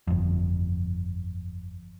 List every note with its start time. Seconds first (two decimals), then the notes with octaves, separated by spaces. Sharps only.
0.07 G1 F2